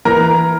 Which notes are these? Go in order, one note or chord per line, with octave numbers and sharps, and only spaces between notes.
E3 A#4 A#5